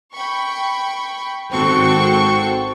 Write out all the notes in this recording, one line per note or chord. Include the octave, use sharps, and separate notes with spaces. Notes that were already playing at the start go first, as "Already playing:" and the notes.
G5 B5 C#6
G#1 C4 F#4 A4 G5 C#6